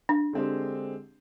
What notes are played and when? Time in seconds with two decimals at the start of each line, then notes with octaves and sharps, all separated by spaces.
0.09 D4
0.33 D3 G#3 C4 G4 C5